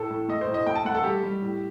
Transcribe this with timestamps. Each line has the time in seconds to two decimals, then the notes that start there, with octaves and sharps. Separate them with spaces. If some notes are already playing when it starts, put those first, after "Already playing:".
Already playing: A2 A3 A4
0.10 A2
0.28 A3 D#5
0.41 C5
0.48 A2
0.54 D#5
0.67 A3 G5
0.75 A5
0.85 A3 F#5
0.95 A4
1.04 G3 G4
1.23 G3
1.42 A2